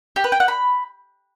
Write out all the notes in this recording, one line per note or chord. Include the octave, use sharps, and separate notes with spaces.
G4
B4
G5
F#5
B5